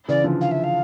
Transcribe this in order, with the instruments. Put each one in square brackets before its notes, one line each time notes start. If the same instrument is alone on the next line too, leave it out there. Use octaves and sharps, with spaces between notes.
[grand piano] C#3 E3 [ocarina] D5
[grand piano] D3 F3
[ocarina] F5
E5
F5